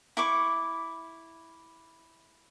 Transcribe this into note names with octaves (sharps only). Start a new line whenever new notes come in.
E4 C#6 D6